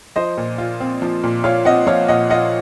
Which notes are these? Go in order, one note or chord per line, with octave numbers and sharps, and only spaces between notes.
F3 C5 D#5
A#2
F4
C4
F3
A#2
F4 C#5 F5
C4 D#5 F#5
F3 C#5 F5
A#2 D#5 F#5
F4 D#5 F#5